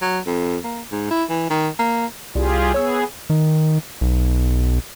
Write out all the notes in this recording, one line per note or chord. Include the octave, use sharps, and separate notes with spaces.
F#3
F2
A#3
G#2
E4
E3
D#3
A#3
C2 G3 F4 G4 G#4
B3 G#4 C#5 E6
D#3
B1